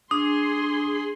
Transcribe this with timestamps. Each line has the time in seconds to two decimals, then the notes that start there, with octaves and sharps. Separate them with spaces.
0.11 D4 G#4 C6 D#6